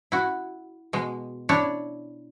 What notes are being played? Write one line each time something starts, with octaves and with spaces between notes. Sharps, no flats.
E4 F#4
B2 G#3
D4 E4 C#5